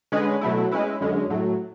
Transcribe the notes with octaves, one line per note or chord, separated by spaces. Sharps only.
D3 G#3 C#4 G#4 B4
B2 F#3 A3 E4
G#3 C#4 E4 B4
F#2 D3 G#3 C#4
A2 F#3 A3